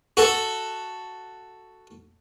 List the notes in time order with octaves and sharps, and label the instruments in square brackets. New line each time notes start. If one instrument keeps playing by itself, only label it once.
[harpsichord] F#4 A4